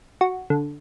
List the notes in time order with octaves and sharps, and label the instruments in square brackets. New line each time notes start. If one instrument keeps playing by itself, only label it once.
[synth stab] F#4
D3